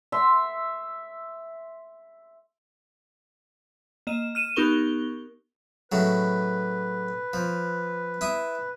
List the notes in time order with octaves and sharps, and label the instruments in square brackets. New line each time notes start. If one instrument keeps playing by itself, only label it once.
[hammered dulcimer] E5 C6
[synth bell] A#3 D#5 E7
F6 D#7 E7
B3 D#4 G4 A#4 C#6 G7
[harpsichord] A2 C#3 F#3 [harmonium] B4
[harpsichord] F3
E4 D#6